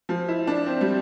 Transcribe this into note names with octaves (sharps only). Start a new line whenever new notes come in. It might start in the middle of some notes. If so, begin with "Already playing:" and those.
F3
E4
D4
C4
G3